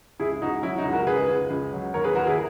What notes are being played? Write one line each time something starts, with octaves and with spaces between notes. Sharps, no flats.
C#2 E4 G#4
C#2 D#4 F#4
F#3 E4
D#4 F#4
C#2
F#4 A#4
C#2 G#4 B4
C#2
C#2
F#3
D#2 A#4 C#5
G#4 B4
D#2 F#4 A#4
E4 G#4